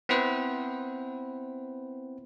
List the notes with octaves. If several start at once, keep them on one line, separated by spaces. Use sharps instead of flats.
B3 C4 E4 B4 C5